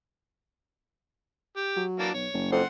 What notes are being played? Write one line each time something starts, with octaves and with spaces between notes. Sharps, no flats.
G4
F#3
E3 A#3 D4
B1 C#5
F#1
F2 F#5 C6